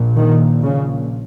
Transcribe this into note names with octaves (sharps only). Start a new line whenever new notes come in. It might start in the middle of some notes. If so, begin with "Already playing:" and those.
Already playing: A#1 A#2
D#3
C#3